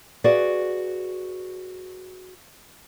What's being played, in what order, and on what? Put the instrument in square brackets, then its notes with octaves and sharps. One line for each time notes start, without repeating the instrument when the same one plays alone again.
[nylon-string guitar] F#4 G#4 B4 D5 E5 F5